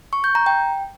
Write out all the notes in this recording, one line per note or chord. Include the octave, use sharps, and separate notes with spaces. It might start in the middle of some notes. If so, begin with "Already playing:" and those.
C#6
G6
A#5
G5